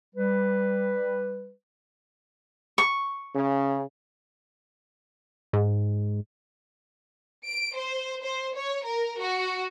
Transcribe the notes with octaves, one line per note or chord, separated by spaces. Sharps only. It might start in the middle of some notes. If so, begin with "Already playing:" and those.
G3 B4
C#6
C#3
G#2
D7
C5
C5
C#5
A#4
F#4